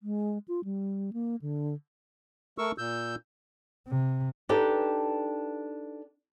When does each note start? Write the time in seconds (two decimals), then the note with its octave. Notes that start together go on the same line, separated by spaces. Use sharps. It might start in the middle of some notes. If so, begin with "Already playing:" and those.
0.03 G#3
0.48 F4
0.64 G3
1.13 A#3
1.42 D3
2.58 A3 A#4 C#6 E6
2.78 A#2 E6 G6
3.88 C3
4.49 D4 D#4 G4 A4 B4